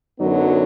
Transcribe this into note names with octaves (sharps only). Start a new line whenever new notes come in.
F#2 D3 F#3 B3 D#4